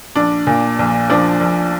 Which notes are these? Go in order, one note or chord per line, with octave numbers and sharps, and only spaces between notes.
A#1 D4
A#2
A#1
F3 D4
A#1